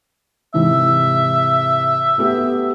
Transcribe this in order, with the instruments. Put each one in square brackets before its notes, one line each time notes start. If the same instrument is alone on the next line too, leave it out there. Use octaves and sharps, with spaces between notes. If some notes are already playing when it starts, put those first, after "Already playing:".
[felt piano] G#2 C3 E3 [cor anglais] E5
[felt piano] A3 B3 G4